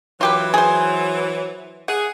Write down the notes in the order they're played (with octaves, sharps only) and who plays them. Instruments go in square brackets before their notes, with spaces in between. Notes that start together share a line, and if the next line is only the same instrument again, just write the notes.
[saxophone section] E3 F#3 [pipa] F4 G4 B4
[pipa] G#4 C5
[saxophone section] G#4 [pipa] F#5